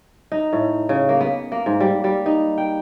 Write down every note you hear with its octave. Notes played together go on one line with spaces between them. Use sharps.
D#4
A2
C#3
A#3
B3
A#3
G#2
G3
G3
D#4
G5